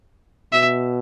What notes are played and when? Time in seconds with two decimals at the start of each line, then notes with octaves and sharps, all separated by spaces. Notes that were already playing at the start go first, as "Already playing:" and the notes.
0.52 B2 E5